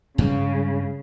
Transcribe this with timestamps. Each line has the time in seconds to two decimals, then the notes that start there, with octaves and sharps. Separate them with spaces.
0.18 G2 C#3 G3 G#3